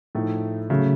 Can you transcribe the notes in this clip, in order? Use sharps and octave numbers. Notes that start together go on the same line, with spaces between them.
A2 F3 A3 D#4
C#3 F#3 A3